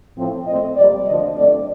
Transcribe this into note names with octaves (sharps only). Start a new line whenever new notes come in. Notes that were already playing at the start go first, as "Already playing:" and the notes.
A2 F3 C4
A#2 A3 C4 D#5
F2 C3 G3 A#3 D5
D2 D3 F3 D#5
G2 D3 A3 C4 D5